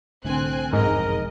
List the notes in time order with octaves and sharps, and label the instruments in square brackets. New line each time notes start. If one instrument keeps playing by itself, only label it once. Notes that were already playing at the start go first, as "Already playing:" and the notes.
[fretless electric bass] C2 A2 D3 [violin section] C4 G#5 F#6
[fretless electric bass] E1 B1 F2 [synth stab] G#2 [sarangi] A#4 [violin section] D#5